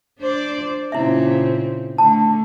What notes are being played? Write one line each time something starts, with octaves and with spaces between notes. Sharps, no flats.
D4 C5 D5
A#2 C#3 C4 E4 E5
D3 A3 A5